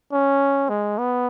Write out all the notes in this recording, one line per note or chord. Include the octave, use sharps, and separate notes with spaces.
C#4
G#3
B3